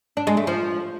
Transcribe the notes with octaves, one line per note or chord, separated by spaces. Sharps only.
D4
G#3
A3
F3